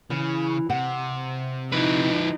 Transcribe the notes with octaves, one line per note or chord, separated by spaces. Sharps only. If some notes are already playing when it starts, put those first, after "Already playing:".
C#3 E3
C3 F#5
F3 D#4 E4 B4